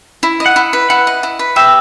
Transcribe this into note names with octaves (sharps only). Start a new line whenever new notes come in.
E4
D#5
F#5
E4
B4
E4 F#5
D#5
E4
B4
G4 E5